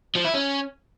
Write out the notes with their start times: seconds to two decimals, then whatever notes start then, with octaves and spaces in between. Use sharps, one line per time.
0.16 F3
0.25 E4
0.34 C#4